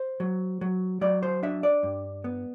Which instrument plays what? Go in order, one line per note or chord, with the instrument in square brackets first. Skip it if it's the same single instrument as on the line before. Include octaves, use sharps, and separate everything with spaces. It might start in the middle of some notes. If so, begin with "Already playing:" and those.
Already playing: [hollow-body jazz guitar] C5
F#3
F#3
F#3 D5
C5
D4 E5
D5
G2
B3